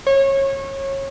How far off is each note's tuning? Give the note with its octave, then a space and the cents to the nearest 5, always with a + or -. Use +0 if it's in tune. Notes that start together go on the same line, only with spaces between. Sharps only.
C#5 -25